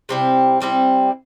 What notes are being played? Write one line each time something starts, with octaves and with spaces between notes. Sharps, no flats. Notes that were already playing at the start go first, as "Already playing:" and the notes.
C3 G3 C4 E4
C3 G3 C4 E4